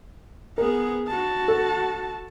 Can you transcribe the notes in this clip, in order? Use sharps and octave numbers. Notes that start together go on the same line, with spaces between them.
B3 G#4 A#4
F#4 A5
A4